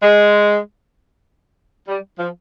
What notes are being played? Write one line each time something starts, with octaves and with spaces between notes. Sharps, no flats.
G#3
G3
F3